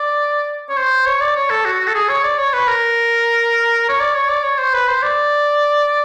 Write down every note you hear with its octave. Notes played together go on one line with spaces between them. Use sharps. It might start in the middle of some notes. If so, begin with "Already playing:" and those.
Already playing: D5
C#5
C5
C#5
D5
C#5
A4
F#4
F#4
A4
G#4
C#5
D5
C#5
B4
A#4
C#5
D5
C#5
D5
C#5
C5
B4
C5
D5